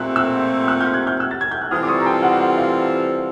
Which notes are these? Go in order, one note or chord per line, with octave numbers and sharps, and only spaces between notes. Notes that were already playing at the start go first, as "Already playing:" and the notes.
Already playing: A#2 F3 A3 C4 E6 F#6
E6 F#6
E6 F#6
F6 G6
F#6 G#6
F6 G6
E6 F#6
A6
G#6
G6
F#6
E3 G3 C4 F4 A4 D#6 F6
D6
C#6 D#6
A#5
G5 A5
F#5
F#5
F5